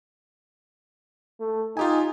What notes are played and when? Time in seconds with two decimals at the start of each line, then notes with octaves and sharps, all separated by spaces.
1.40 A3
1.77 D#4 F4 G4 G#5